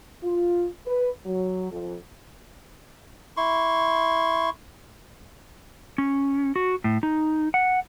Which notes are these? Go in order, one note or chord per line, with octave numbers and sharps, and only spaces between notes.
F4
B4
F#3
F2
E4 C6 C#6
C#4
F#4
A2
D#4
F#5